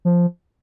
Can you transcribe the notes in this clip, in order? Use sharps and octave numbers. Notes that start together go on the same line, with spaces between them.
F3